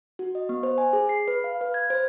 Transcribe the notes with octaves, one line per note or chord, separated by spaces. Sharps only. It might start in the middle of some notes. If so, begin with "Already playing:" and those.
F#4
D#5
B3
C5
G#5
G#4
C7
B4
F5
B4
G#6
C5